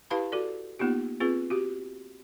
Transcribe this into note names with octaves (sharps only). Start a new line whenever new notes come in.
E4 G4 B4 F5 A5 B5
F#4 A4 D5
A#3 B3 D#4 F4 G4
C4 F4 G#4 B4
F#4 G4